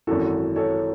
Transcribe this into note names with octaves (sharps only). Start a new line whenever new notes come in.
G#1 F#2 E3 F#4 A4
A4 C#5